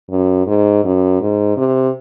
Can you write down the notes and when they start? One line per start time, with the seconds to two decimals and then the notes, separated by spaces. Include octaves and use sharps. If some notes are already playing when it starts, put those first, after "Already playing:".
0.11 F#2
0.47 G#2
0.85 F#2
1.21 G#2
1.57 C3